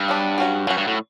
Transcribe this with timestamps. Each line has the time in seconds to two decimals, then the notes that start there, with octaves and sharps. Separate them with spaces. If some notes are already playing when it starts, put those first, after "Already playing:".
Already playing: G2
0.08 F#3 B3 D4
0.38 F#3 C#4 F#4
0.67 F#2 F#3 C#4 F#4
0.77 G2
0.87 A2